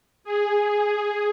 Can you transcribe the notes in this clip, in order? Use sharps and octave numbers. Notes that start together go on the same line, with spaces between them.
G#4